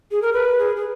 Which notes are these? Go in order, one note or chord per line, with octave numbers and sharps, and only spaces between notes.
G#4
A#4
B4
G#4
G#4